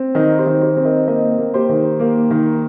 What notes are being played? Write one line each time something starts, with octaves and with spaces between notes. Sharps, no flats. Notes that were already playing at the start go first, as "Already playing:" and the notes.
Already playing: C4
D#3 A#4 D#5
G4 C5
D#3
G4 C5
C4
A#4 D#5
A#3 A#4 D#5
A#3
G4 C5
D#3
A#3
D#3